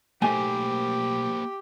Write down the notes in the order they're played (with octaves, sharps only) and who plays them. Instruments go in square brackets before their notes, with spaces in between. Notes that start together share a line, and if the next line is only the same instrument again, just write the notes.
[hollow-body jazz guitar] B1 A3 G#5 [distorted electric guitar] A#3 C5 [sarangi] G4